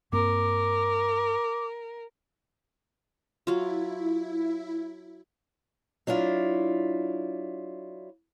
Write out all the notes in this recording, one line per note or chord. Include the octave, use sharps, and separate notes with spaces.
G2 A#3 C4 A#4 D6
F#3 E4 F4
F#3 D4 E4 F4